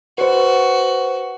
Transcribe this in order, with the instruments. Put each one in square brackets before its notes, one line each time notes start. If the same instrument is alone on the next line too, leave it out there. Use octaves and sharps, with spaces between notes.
[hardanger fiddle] F#4 [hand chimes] B4 C5